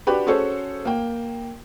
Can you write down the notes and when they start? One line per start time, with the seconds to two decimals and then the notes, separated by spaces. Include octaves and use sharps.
0.07 D4 F#4 G4 B4
0.27 C#4 F#4 G#4 A4 C5 C#5
0.85 A#3 G5